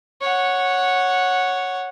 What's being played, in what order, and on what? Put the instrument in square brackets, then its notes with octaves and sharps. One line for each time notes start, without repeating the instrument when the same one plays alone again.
[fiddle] C#5 F#5